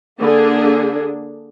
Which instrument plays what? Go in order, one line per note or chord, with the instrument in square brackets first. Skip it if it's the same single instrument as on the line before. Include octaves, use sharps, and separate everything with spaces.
[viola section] D3 A#3 D4 G#4